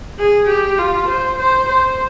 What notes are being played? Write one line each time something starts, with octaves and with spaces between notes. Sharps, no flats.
G#4
G4
F4
C5
C5
C5